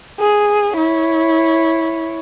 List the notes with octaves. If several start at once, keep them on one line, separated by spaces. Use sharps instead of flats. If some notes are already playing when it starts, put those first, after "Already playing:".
G#4
E4 C#5